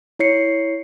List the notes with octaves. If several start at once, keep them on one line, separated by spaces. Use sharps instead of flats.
E4 C#5 C7 C#7